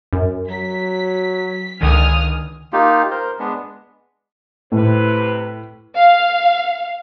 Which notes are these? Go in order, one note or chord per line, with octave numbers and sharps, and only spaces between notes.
F#2
F#3 B6
C#2 D3 D#3 G#5 D#6 F6
A#3 D#4 F4 G4
A#4 C5
G#3 B3 D4
A2 C3 B4
F5